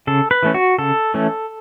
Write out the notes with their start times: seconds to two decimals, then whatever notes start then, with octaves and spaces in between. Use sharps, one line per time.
0.07 C#3 A4
0.31 B4
0.43 E3 A3 C#4
0.54 F#4
0.78 C#3 A4
1.14 E3 A3 C#4